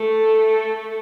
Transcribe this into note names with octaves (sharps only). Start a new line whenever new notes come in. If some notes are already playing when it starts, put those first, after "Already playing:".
Already playing: A3 A4